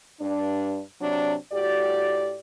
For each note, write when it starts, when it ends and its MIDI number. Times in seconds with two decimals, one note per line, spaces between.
0.20 0.81 43
0.20 0.81 62
1.01 1.35 48
1.01 1.35 54
1.01 1.35 62
1.52 2.39 45
1.52 2.39 66
1.52 2.39 67
1.52 2.39 74